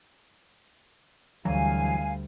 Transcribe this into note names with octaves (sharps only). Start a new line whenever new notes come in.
D2 E3 F#3 G3 F5 G#5 A#5